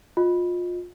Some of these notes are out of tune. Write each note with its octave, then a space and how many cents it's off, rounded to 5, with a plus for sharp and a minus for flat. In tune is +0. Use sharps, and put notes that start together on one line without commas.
F4 +25 D#5 +0